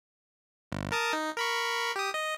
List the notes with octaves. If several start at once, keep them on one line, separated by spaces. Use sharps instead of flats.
G1
A#4 A5 D#6
D#4
A#4 B5 C#6
G4 D#6
D#5